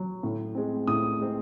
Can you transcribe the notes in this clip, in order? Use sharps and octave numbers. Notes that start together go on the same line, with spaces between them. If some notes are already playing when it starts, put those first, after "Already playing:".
Already playing: F#3
A2
G#3 C4
A2 D#6
G#3 C4